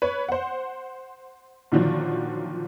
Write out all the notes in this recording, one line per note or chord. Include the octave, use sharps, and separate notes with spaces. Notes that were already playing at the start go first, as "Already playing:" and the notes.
B4 C#5
C5 F#5
A#2 D3 D#3 F3 F#3